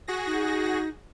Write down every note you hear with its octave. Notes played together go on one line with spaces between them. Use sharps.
F#4 G#4 A#6
D#4